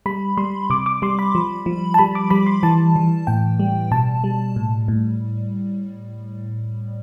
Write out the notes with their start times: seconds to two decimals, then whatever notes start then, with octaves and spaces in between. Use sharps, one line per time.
0.06 G3 B5
0.37 G3 C6
0.70 C3 D6
0.86 D6
1.02 G3 C6
1.19 B5
1.35 F3
1.66 F3
1.94 A5
1.99 G3 B5
2.15 D6
2.30 G3 B5
2.47 C6
2.63 E3 A5
2.96 E3
3.27 A2 G5
3.60 G3
3.91 B2 A5
4.24 G3
4.56 A2
4.88 A2